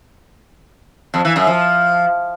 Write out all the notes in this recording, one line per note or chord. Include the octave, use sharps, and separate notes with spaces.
F2
E3
F#2
F3